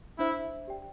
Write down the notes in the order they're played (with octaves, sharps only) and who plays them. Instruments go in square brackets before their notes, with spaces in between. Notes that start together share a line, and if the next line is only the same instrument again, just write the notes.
[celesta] D4 C5 E5 [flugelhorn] E4
[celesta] G4 D5 G5